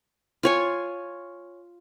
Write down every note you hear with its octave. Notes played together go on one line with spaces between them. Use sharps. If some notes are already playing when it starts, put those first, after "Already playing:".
F4 C#5 G#5